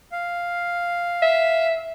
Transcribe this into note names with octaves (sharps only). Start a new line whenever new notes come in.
F5
E5